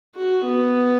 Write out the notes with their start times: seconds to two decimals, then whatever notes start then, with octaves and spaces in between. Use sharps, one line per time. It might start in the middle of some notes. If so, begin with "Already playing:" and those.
0.16 F#4
0.45 B3